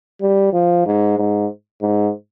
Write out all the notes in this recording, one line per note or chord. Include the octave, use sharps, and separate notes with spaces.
G3
F3
G#2
G#2
G#2